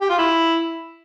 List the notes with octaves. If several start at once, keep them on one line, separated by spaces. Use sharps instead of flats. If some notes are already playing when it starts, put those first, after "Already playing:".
G4
F4
E4